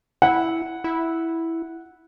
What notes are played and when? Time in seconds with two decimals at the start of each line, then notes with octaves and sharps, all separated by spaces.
0.22 E4 F#5
0.84 E4